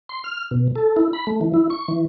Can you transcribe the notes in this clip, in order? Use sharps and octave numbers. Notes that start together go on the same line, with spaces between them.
C6
F6
B2
A4
E4
B5
A3
E3
E4
C#6
E3